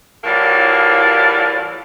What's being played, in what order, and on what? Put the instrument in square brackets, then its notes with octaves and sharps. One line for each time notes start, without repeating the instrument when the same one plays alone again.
[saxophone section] A2 E3 F#3 G3 A#3 F4